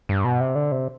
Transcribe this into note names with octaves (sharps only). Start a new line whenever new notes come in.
G2
B2
C3
D3
C3